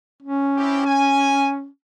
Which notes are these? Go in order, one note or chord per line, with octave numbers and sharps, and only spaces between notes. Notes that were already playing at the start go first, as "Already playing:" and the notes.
C#4
C4 E4 G4
G#5